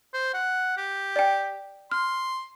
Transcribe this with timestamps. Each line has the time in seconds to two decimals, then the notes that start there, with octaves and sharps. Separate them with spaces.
0.14 C5
0.34 F#5
0.77 G4
1.16 D5 G5
1.92 C6 F6